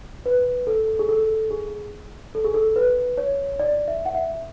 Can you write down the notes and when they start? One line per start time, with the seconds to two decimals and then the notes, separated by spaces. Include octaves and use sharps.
0.26 B4
0.67 A4
0.99 G#4
1.09 A4
1.51 G#4
2.35 A4
2.45 G#4
2.54 A4
2.76 B4
3.18 C#5
3.59 D5
3.88 E5
4.06 F#5
4.15 E5